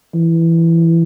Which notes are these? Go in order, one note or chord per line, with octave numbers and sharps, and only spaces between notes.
E3